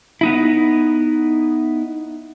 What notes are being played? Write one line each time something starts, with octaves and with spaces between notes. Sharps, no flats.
B3 D#4 E4